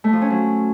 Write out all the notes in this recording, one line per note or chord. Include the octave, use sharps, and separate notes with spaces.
A3
F3
C#4
F#3